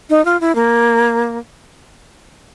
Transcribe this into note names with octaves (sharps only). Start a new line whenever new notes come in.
D#4
F4
E4
A#3